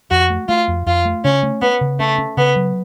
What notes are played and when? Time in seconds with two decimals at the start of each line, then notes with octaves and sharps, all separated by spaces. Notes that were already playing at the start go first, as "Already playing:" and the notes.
0.11 F2 F#4
0.30 A3
0.48 A3 F4
0.68 F2
0.86 F2 F4
1.05 A3
1.24 C#3 C#4
1.43 A3
1.61 B3 C#4
1.81 C#3
1.99 A3 C#4
2.18 C#4
2.37 C#3 B3
2.56 F#3